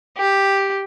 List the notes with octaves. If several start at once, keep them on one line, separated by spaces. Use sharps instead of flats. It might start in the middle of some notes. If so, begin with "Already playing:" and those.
G4